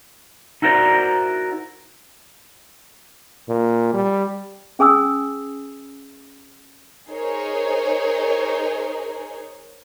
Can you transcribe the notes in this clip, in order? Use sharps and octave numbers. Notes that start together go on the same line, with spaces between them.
D#4 E4 F#4 A#4 C5 D5
A#2
G3
C#4 G#4 G#5 D#6 E6
D#4 G#4 A#4 C5 C#5